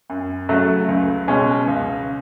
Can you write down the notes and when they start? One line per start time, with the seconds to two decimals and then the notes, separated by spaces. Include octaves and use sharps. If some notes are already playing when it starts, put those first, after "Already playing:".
0.10 F#2
0.49 C#3 F#3 A3
0.89 C#2
1.28 B2 G#3 C#4
1.67 C#2